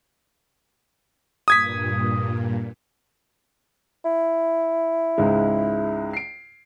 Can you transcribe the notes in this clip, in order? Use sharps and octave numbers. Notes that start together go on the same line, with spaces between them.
G2 A#2 D#6 G#6 B6
E4
C#2 G#2 G#3
C7 D7